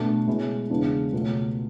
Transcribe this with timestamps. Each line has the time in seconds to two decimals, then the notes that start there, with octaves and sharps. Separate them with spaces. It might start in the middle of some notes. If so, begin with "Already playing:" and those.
Already playing: B2 A3 D4 A4
0.27 B2 G#3 C#4 E4
0.70 E2 C#3 G#3 B3 D4
1.13 C#2 B2 F#3 A3